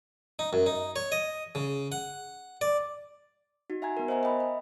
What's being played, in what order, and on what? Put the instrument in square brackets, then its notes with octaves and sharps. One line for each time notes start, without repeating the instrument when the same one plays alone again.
[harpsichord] D#4
F#2
D#4
C#5
D#5
C#3
F#5
D5
[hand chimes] D#4 F#4
E5 F#5 G#5 A#5 G#6
B3 A#4
C5 D#5 E5 F#5 G#5 A#5
D#5 E5 G5 B5
D#5